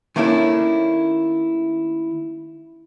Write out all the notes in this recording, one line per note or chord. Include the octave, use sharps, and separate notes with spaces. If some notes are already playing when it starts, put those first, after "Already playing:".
D#3 A3 A#3 C#4 D4 E4